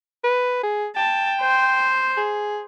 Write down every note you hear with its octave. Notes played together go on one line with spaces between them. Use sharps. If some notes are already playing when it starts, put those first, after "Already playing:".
B4
G#4
G5 A5
C5
G#4